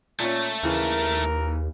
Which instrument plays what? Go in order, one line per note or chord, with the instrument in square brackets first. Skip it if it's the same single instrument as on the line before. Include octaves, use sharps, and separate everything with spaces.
[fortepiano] A#2 C#4 [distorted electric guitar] A3
[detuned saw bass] D#2 [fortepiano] C#3 E3 [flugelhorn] A#4